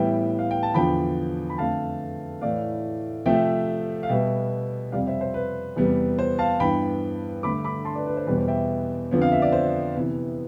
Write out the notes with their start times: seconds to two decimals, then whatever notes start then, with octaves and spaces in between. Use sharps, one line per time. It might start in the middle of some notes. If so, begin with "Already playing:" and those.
Already playing: A2 E3 G3 B3 E5 G5
0.39 F5
0.51 G5
0.63 A5
0.74 E2 D3 F3 G5 B5
1.50 B5
1.58 F2 D3 A3 F5 A5
2.41 A2 E3 A3 D5 F5
3.26 C3 F3 A3 E5 G5
4.03 F5
4.09 B2 G3 B3 E5 G5
4.92 F2 C3 G3 D5 F5
5.07 C5 E5
5.21 C5
5.34 B4
5.76 E2 C3 G3 B3
6.19 C5
6.39 F5 A5
6.60 G2 E3 B3 G5 B5
7.43 G2 D3 A3 B5 D6
7.64 B5 D6
7.85 A5 C6
7.95 B4 D5
8.06 B4
8.17 C5
8.27 E2 B2 G3 B3 B4
8.37 C5
8.47 E5 G5
9.11 F2 D3 F3 B3
9.22 F5
9.32 E5
9.42 D5
9.52 C5
9.94 C3 E3 B3